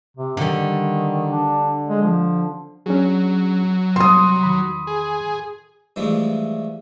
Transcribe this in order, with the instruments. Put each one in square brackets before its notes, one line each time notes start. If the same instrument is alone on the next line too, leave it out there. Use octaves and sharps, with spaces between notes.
[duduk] C3
[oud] D3 G3 [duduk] D#3
[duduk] D4
G#3
F3
[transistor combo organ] F#3 [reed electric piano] C#4 D4 G#4
[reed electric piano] C3 G3 [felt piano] C6 D#6
[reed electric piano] E2 D#3 B5
[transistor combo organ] G#4
[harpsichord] G2 E3 F3 G#3 A3